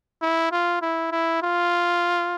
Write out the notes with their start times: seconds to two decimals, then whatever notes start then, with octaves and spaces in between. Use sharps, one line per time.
0.22 E4
0.51 F4
0.81 E4
1.11 E4
1.42 F4